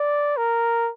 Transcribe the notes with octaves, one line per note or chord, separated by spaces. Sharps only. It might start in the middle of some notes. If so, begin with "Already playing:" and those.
Already playing: D5
A#4